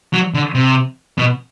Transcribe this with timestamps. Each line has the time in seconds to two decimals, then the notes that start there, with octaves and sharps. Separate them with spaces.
0.13 F#3
0.34 D3
0.55 C3
1.18 B2